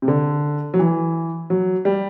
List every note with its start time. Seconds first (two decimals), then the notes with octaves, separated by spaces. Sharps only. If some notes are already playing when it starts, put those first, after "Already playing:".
0.02 C3
0.08 D3
0.74 F#3
0.79 E3
1.50 F#3
1.85 G3